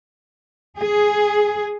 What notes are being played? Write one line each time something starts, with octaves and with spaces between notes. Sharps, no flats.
G#4